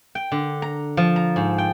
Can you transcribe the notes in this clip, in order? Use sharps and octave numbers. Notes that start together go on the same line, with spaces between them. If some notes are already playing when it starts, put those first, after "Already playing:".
G5
D3
A#5
F3
A#5
G#2
G5